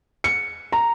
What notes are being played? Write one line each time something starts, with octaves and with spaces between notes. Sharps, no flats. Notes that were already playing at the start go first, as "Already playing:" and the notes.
C#7
A#5